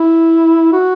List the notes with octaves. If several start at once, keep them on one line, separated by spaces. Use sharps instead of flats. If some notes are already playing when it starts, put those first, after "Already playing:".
Already playing: E4
F#4